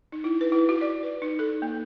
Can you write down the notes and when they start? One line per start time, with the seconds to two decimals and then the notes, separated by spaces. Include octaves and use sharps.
0.12 D#4
0.24 E4
0.41 B4
0.52 E4
0.69 F#4
0.81 D5
1.03 B4
1.22 D#4
1.39 A4
1.62 A#3